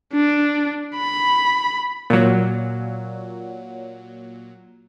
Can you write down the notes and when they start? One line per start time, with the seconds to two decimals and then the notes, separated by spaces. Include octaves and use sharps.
0.13 D4
0.96 B5
2.10 A#2 F#3